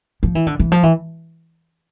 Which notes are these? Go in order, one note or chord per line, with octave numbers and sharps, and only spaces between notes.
F3
E3
D3
E3
F3
E3